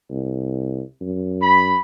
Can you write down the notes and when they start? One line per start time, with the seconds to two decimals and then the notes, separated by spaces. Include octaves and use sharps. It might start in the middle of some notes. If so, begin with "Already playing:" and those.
0.11 C2
1.01 F#2
1.42 B5